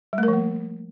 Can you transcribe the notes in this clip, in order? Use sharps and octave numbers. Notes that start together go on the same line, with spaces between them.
G3
A3
A#4
F3
A#3